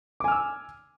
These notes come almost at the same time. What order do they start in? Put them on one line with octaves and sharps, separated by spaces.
D6 G#5 F6 E6